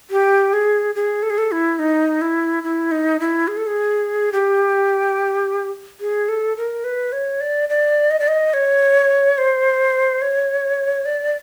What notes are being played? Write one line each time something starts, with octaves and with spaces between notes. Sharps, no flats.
G4
G#4
G#4
A4
G#4
A4
E4
D#4
E4
E4
D#4
E4
G#4
A4
G#4
G4
G#4
A4
A#4
B4
C#5
D5
D5
D#5
D5
D#5
C#5
C5
C#5
D5